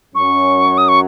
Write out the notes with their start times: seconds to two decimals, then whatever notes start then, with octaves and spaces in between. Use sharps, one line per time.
0.14 F#2 F#3 C#4 C#6
0.78 D#6
0.89 C#6